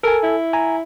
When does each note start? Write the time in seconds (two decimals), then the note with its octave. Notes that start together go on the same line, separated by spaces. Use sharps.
0.03 A4 A#4 G#5
0.23 E4
0.53 G#5 A#5